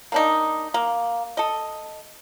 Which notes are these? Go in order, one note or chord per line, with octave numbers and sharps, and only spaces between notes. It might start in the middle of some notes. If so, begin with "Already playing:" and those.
A#3 D4 D#4
A#3
A4 D#5